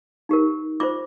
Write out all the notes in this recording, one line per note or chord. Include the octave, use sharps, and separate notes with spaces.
D#4 G4 A#4
F4 C5 D6